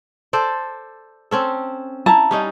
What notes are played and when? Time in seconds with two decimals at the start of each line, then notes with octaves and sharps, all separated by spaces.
0.33 A4 C5 D5
1.31 C4 C#4 A4
2.06 E4 A5 A#5
2.31 G3 C#4 D#4